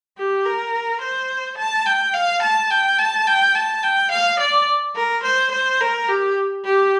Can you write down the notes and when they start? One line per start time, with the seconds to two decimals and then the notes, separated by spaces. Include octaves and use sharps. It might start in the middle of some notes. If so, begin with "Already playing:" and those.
0.18 G4
0.46 A#4
1.02 C5
1.58 A5
1.86 G5
2.14 F5
2.43 A5
2.71 G5
2.98 A5
3.27 G5
3.55 A5
3.83 G5
4.12 F5
4.40 D5
4.96 A#4
5.24 C5
5.52 C5
5.80 A#4
6.08 G4
6.64 G4